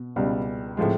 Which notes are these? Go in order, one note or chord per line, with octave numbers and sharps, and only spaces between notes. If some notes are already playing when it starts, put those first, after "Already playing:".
Already playing: B2
C#2 B2 G3
A2 F3 G#3